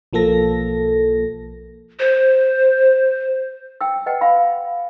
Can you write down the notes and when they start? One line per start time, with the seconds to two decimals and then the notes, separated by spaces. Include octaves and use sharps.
0.13 B1 F3 A#3 A4 A#6
1.99 C5
3.81 G5 E6
4.06 B4 D#5 F#5 G5
4.21 F5 B5